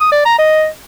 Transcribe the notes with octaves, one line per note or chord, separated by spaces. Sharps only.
D#6
D5
A#5
D#5